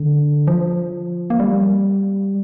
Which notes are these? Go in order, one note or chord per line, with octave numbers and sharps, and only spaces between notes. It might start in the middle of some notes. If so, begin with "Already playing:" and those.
Already playing: D3
F3
A#3
G3